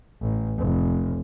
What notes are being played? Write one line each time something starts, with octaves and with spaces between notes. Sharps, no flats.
A1
F1